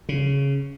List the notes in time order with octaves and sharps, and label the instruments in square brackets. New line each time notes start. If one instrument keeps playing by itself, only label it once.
[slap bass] C#3